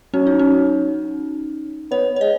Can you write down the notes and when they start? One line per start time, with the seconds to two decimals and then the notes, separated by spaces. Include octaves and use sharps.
0.13 F#3 C#4
0.27 D#4
0.39 C#4
1.91 B3 C#5
2.16 C#5
2.21 G#3 D#5